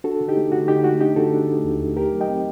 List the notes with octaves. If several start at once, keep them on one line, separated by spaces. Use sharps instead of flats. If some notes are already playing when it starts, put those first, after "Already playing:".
D4 F#4 A4
D3
D#4 G4
A3
D3 F#4
D3 D#4 G4
A3 F#4
D4 D#4 G4
D3 F#4 A4
D4
A3
D#2
A3
D#4 G4 A#4
F#3
D#5 G5
C4